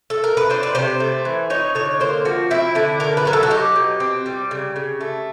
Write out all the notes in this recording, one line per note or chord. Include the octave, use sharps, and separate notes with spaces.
A4
A#4
B4
D4 C5
B4
C3 C5
A3
E3
D#4 C#5
D3 C#5
A#3 C5
F3 F#4
C4 E4
D3 E4
A3 A#4
B4
F#3 A#4
A4
F#4
D#4 G4
B2
C4
G3
C#3
C#3
A3